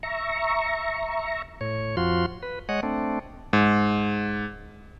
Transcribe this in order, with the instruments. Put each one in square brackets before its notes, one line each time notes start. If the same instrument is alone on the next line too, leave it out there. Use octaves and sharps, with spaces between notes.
[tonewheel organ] E5 A#5 C#6
A2 C#5
F2 F3 F4 F#4 C6
B4
G#3 C#5 D#5 F#5
A3 C4 D4
[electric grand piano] G#2